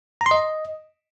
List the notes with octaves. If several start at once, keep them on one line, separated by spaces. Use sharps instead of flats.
A#5
C6
D#5